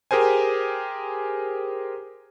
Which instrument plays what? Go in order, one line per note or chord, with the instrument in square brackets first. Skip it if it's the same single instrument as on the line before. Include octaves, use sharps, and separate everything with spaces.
[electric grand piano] G4 G#4 A#4 C5 G#5